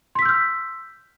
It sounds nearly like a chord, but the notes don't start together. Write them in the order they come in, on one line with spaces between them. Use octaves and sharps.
C6 B6 E6 G6 F6